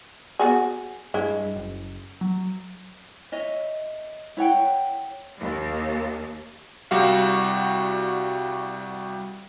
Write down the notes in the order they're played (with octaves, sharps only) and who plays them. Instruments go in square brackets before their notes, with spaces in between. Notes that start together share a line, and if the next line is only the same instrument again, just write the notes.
[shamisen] B3 F#4 G#4
[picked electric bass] G2 [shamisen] G#3 E4
[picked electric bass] F#1
F#3
[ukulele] C#5 D#5 E5
E4 C#5 F#5 G5
[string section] D#2
[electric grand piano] C2 G3 F#4 F5